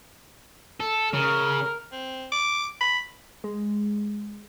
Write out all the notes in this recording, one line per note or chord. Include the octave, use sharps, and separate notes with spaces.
A4
C#3 A#4
C4
D6
B5
G#3